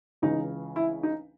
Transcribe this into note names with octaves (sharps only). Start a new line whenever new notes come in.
C#2 C#3 E3 D#4
E4
D#4